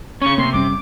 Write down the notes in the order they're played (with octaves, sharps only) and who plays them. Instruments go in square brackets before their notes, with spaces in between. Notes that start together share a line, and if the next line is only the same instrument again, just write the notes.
[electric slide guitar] C#3 C#4 [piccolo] C#6
[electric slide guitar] C3 [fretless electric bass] A#3 [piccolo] C6
[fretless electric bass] F#1 G3 C#4 [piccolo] D6